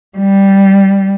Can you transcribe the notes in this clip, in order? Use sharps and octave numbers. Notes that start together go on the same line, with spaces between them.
G3